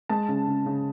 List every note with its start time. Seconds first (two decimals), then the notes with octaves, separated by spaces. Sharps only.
0.09 G#3 A5
0.29 C#3
0.47 C#3
0.66 C#3